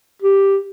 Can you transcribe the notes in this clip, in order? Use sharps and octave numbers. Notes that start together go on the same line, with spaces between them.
G4